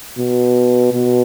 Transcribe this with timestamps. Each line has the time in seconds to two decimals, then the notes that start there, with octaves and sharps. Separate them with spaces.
0.19 B2
0.93 B2